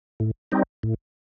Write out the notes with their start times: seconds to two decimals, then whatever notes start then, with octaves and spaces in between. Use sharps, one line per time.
0.20 A2
0.52 G3 C4 D#4
0.83 A2